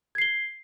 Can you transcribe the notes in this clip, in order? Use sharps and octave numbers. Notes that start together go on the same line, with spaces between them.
G#6 C7 G7